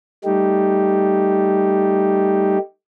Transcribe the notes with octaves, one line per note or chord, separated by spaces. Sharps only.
G3 A3 D#4 G4